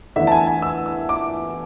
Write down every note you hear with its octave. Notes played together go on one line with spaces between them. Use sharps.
E2 D3 A3 E5
A5
G#5
G#5
E6
E6
D6